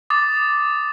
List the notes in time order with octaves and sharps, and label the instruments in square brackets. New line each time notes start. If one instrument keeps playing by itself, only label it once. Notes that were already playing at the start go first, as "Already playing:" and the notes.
[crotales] D6 D#6 A6